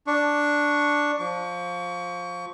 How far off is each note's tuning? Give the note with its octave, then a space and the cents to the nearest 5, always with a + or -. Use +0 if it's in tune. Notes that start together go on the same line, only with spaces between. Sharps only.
D4 +0 C#6 +0
F3 +15 C#6 +30